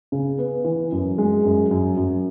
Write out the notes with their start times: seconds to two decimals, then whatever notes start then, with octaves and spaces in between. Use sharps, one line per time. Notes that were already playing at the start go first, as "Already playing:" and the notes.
0.12 C#3
0.38 B3
0.64 E3
0.92 F#2
1.18 G#3
1.45 F#2
1.71 F#2
1.97 F#2